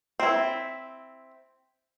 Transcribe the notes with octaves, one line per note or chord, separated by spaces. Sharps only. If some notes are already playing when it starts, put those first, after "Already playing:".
C4 E4